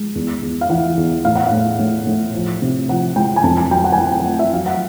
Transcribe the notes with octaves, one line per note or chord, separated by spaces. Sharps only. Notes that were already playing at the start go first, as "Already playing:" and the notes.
Already playing: G#3
E2
E2
F5
E3 F#5
E2
A2 F5
F#5
A2 F5
A2
A2
F3
C3
F3 F#5
G#3 G5
G#5
F2 A5
G#5
F#3 G5
F#5
G#5
F#3 G5
G5
A3 F#5
E5
F#3 F5
F#5